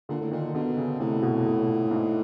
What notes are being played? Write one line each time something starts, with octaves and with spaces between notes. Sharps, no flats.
A#2 D3
A2
A#2 D#3
B2 D3
C#3
A2 C3
B2
B2
A#2
G#2